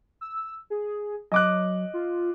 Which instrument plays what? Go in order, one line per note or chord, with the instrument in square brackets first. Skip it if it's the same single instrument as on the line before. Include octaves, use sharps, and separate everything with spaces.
[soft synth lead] E6
G#4
[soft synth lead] F#3 [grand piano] D#5 D6 F#6
[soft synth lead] F4